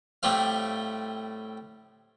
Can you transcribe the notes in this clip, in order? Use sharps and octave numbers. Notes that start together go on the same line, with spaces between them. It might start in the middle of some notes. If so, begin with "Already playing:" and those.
A2 G3 A3 C4 F5